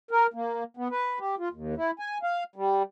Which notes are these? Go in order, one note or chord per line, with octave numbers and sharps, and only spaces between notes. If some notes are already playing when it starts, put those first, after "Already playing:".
A#4
A#3
B3
B4
G4
F4
D#2
E4
G#5
F5
G3